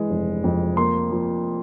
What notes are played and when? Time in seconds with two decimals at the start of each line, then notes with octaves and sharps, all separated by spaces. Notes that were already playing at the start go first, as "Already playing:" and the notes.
Already playing: E3 G#3
0.10 F1
0.44 F2
0.77 A#3 C6
1.11 F3